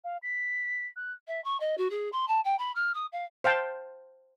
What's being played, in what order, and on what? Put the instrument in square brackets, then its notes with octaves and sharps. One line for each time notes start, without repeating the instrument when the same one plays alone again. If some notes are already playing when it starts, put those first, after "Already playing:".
[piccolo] F5
B6
F#6
[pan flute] E5
C#6
D#5
F#4
G#4
C6
A5
G5
B5
F6
D#6
F5
[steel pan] C5 F5 G5 A5